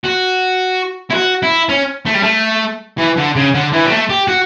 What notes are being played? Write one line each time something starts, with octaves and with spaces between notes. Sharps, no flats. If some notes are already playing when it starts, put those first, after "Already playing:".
F#4
E4
F#4
E4
C#4
A3
G3
A3
E3
D3
C#3
D3
E3
G3
A3
G4
F#4